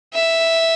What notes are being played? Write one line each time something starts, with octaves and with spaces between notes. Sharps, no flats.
E5